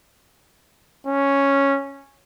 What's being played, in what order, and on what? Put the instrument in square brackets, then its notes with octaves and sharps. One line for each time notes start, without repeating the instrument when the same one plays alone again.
[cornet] C#4